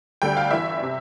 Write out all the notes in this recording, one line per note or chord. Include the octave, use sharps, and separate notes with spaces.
D2 D3 G3 G5
F5
G1 G2 E3 E5
C3